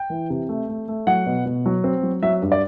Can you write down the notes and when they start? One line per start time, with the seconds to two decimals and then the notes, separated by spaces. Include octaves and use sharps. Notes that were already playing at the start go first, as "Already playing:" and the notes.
Already playing: G5
0.10 E3
0.30 C3
0.49 A3
0.69 A3
0.88 A3
1.07 F#3 F#5
1.26 B2
1.46 B2
1.66 F#3
1.84 C4
2.03 F#3
2.23 F#3 E5
2.42 G2
2.52 D5